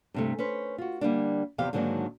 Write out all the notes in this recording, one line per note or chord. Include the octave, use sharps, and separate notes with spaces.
G2 C3 A3
C#4 B4 C5
F4 F#4
D3 G3 A#3 D4
E2 C3 F3 G4 F5
G#2 D3 D#3 F#3 A#3 D4